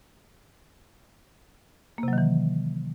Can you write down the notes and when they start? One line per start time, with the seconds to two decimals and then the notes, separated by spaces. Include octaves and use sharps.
1.98 A#3
2.03 C3
2.08 F#3
2.13 D#3
2.18 E3